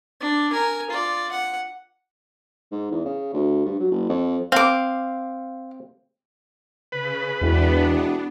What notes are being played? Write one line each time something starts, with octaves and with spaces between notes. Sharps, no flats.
D4
A#4 G#5
F4 D5
F#5
G#2
E2
C#3
D2
G2
F#3
F#1
F2
C4 F5 D6
C#3 B4
E1 E2 B3 D4